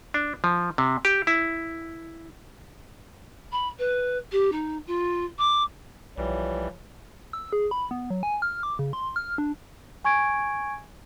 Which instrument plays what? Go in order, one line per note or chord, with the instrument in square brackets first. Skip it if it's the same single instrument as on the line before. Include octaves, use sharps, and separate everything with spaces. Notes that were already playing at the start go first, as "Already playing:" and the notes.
[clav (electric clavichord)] D4
F3
C3
G4
E4
[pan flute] B5
B4
G4
D#4
F4
D6
[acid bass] B1 [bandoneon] E3 G3 [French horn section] F3 C#5
[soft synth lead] E6
G#4
B5
B3
F#3
G#5
F6
D6
C#3
C6
F6
D4
[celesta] G#5 C#6 G#6 D7